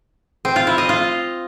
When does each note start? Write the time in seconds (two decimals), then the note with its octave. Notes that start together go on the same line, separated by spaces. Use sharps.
0.45 C4
0.56 F4
0.67 E4
0.78 D#5
0.89 F4